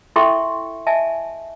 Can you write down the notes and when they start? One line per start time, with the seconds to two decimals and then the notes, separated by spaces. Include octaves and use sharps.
0.16 E4 A4 E5 G5 C6 C#6
0.87 D#5 E5 G#5 A5